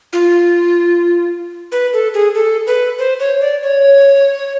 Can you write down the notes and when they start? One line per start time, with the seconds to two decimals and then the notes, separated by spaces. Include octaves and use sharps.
0.13 F4
1.72 B4
1.93 A4
2.14 G#4
2.35 A4
2.67 B4
2.99 C5
3.20 C#5
3.41 D5
3.63 C#5